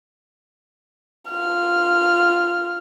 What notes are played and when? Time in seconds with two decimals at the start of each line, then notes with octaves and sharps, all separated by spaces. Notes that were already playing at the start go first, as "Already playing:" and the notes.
1.31 F4 F6